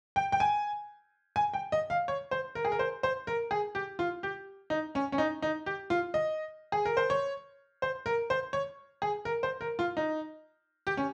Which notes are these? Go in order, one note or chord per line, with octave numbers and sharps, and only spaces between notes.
G5
G5
G#5
G#5
G5
D#5
F5
C#5
C5
A#4
G#4
A#4
C5
C5
A#4
G#4
G4
F4
G4
D#4
C#4
C#4
D#4
D#4
G4
F4
D#5
G#4
A#4
C5
C#5
C5
A#4
C5
C#5
G#4
A#4
C5
A#4
F4
D#4
G4
C#4